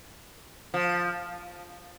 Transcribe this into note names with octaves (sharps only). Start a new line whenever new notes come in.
F3